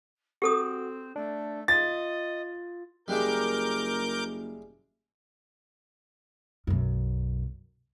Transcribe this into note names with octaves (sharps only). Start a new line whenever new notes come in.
C4 F#4 G4 A4 D#6
A3 D4
F4 D#5 A6
F#1 G3 G#3 E4 A#4 D6 G6
B1 F#2